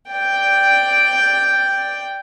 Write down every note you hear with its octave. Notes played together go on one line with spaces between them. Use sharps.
D5 G5